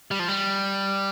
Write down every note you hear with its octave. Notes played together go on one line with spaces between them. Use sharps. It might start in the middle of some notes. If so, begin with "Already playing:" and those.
G3
F3
G3